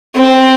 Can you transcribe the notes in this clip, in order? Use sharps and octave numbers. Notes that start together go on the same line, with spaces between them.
C4